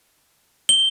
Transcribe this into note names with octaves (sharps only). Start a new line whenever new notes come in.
G7